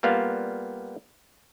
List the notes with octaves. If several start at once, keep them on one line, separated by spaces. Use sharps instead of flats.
G3 A#3 B3 F4 F5